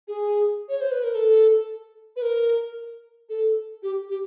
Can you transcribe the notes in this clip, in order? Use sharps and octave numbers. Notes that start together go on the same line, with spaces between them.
G#4
C#5
C5
B4
A#4
A4
B4
A#4
A4
G4
G4